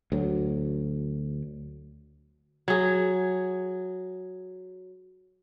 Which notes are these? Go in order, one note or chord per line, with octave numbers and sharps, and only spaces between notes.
D2 F#3
F#3 G#4